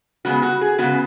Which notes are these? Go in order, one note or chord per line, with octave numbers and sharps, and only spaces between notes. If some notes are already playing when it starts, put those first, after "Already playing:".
C#3 G#3 B3 F#4
F#4
G#4
C#3 G#3 B3 F#4